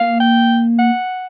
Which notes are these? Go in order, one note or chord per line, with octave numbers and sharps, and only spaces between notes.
A#3 F5
G5
F#5